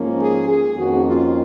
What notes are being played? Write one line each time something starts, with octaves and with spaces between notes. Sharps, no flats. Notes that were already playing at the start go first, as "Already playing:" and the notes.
Already playing: G#2 F3 A#3 C#4
G#4
G#4
F2 D#3 A#3 C#4 F#4
F4